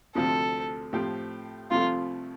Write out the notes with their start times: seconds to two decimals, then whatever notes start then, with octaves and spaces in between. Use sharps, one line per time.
0.15 D2 C3 F3 C4 A4
0.93 A2 F3 C4 G4
1.71 C2 C3 F3 A3 F4